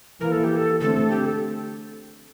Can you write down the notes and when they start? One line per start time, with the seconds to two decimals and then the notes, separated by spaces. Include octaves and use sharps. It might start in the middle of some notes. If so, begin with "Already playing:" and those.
0.21 E3 A#3 A#4
0.32 A4
0.44 G4
0.56 A4
0.80 D3 A3 C4 A4
1.10 G4
1.25 A4